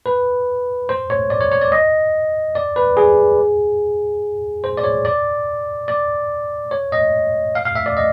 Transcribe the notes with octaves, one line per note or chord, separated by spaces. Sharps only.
B4
C5
C#5
D5
C#5
C#5
D5
D#5
D5
B4
G#4
C5
D5
C#5
D5
D5
C#5
D#5
F5
F5
E5
D5
D#5